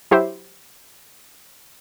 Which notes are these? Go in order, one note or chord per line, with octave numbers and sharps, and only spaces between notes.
F#3 E4 G4 C5 E5